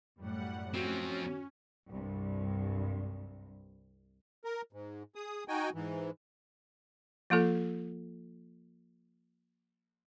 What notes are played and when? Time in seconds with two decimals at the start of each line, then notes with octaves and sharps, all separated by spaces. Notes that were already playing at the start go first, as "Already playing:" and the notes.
0.17 F#2 A2 G3 F#5
0.74 F3 C4 C#4 F#4
1.89 C2 G2
4.45 A#4
4.73 G#2
5.15 G#4 D#6
5.48 D#4 F#4 G5 G#5
5.74 G#2 E3
7.30 F3 A#3 F4 A4